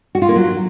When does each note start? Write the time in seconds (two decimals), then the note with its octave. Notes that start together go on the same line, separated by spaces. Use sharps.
0.15 F#4
0.22 F4
0.29 A#3
0.36 F#3